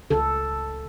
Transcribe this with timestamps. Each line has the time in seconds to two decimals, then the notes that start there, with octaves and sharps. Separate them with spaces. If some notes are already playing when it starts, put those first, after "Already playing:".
0.10 C#2 A4